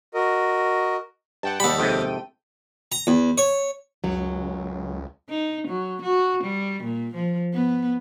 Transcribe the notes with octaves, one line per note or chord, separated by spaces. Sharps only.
F#4 A#4 D#5
G2 F#5 G5 A5
D#2 G3 B5
F2 G#2 C3 A4 G5 D#7
A#5
E2
C#5
C#2 F#2 F#3
D#4
F#3
F#4
G3
A#2
F3
B3